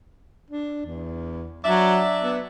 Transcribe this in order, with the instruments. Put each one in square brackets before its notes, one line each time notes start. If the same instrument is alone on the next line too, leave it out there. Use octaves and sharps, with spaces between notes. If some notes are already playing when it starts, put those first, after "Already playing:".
[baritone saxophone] D4
E2
[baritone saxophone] F#3 [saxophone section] D4 D5 E5
[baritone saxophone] B3